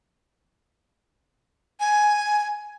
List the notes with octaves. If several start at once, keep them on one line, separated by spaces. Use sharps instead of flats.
G#5